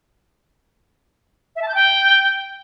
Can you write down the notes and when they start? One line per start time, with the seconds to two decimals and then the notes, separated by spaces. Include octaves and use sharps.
1.56 E5
1.62 A5
1.68 G6
1.75 G5